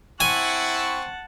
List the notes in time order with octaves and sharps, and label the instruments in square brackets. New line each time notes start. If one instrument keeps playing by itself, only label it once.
[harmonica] C4 C#6 [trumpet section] E4 [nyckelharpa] F#5 A5 [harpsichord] G#5